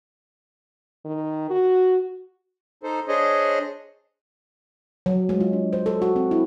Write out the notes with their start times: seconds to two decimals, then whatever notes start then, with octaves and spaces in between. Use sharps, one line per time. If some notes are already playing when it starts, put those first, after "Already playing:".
1.05 D#3
1.50 F#4
2.83 D#4 A4 C5
3.08 D4 G#4 C5 C#5 D#5
5.06 F#3
5.29 G#3
5.41 F4
5.53 D4
5.73 C5
5.86 A4
6.02 F#4
6.16 C4
6.31 E4